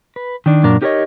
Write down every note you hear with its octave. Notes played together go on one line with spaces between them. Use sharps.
B4
D#3 D4
F#2 A#2 D4 A#4
D#4 G4 A#4 C5 C#5 D#5